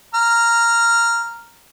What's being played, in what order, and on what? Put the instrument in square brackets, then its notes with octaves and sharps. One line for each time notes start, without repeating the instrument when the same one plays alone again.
[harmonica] A#5 F6